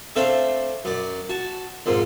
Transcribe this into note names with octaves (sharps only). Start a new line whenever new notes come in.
A3 C4 D4 A4 E5 F5
F#2 D5
F#4 A5
F2 G#2 A#3